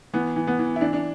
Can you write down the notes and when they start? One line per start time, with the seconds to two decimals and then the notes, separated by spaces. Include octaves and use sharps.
0.13 E3 B3
0.36 E3
0.47 B3
0.59 E3
0.76 E4
0.81 E3 D4
0.93 D4